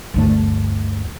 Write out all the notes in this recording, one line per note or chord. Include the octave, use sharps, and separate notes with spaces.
G1 D2 A3